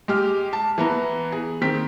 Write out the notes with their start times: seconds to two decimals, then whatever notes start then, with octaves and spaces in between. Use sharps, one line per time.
0.08 G#3 G4 F6
0.53 A5
0.78 E3 B3 A#5
1.32 G#4
1.61 D#3 C4 B6